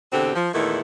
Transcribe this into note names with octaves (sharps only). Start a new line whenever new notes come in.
E2 B2 D3 C4 G4
F3
E2 A#2 D#3 A3 E4